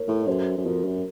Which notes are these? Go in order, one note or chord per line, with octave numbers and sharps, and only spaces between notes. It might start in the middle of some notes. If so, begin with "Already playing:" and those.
Already playing: A#4 C#5
A2
C#5
F#2 A4 C5
F#2
F2 F#4 A#4
F#2